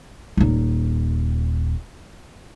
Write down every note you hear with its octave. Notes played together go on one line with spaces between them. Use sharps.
D#1 D#4